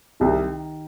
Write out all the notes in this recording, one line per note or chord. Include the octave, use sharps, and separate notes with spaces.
C2 D#3